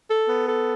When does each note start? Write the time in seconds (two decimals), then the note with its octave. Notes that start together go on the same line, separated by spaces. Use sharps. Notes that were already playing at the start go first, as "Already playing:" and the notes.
0.10 A4
0.29 B3
0.48 A4